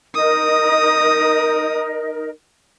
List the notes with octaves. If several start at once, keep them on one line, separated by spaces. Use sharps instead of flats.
D#4 A#4 D#5 D#6